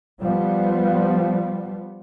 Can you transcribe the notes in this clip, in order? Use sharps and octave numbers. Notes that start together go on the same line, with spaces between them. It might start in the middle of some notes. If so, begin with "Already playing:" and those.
F3 G3 B3